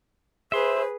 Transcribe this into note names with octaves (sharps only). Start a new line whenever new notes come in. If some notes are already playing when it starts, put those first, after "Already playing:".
G#4 B4 C5 E5 C6